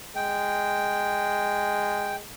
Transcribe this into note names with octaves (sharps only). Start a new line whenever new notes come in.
G#3 G5